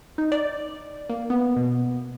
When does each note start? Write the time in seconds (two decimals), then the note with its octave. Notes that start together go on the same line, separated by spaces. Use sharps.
0.18 D#4
0.32 D5
1.09 A#3
1.30 B3
1.56 B2